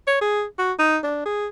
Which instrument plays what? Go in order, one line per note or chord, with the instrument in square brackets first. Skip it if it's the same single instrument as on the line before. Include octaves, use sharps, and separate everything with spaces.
[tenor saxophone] C#5
G#4
F#4
D#4
D4
G#4